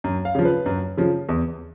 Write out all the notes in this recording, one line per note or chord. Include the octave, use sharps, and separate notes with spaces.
F#2
F5
C#3 F3
B4
F#2
C#3 F3
E2